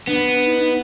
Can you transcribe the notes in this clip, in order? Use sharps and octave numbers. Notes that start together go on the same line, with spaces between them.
B3 D4
D#4